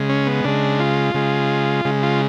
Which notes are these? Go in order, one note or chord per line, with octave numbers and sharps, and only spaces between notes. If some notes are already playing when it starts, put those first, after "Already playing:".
Already playing: C#3 G#3
C#4
B3
C#3 G#3 D4
F4
C#3 G#3
C#3 G#3
F4